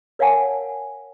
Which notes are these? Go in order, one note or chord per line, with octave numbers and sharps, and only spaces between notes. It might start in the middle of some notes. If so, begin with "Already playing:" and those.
A#4 C#5 F5 F#5 G#5 A5